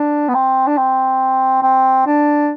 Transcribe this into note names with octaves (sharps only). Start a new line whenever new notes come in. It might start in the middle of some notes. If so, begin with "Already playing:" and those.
Already playing: D4
B3
C4
D4
C4
C4
D4